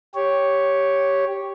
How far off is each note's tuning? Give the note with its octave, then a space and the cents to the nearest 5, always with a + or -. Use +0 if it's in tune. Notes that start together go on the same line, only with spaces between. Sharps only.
G4 +0 C#5 +0